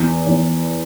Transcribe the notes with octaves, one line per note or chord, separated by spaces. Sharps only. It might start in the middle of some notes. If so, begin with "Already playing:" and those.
Already playing: E2
E2